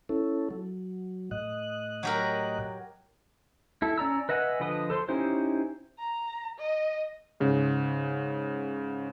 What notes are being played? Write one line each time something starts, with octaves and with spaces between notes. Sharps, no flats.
C#4 E4 A4
F#3
A2 D#5 F#6
F#3 G4 A#4
E4 A4
C#4 D5 A#5 E6
B4 D#5 E5 F#5 G#5
D3 F3 B4 D#5 D#6
A4 C5 C6
C#4 D#4 E4 G4 C5
A#5
D#5
G#2 C#3